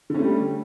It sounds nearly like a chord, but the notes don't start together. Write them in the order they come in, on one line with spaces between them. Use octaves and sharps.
D3 C#4 A3 G3